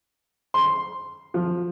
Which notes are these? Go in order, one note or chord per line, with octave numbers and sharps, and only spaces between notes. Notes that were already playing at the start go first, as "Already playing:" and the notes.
C6
F3